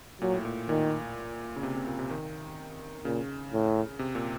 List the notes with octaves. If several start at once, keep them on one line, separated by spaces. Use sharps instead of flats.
A#2 F#3
A2
A#2
A#2 D#3
C#3
C3
C3
A#2
C3
D#3
A#2 C#3
A2
C3
A#2